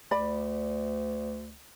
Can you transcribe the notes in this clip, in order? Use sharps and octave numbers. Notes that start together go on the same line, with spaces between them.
D2 D5 B5